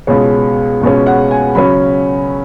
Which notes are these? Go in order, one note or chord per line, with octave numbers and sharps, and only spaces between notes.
C#2 B2 G#3 C#5
C#2 B2 G#3 C#4
F#5
G#5
C#3 F#3 C#4 B5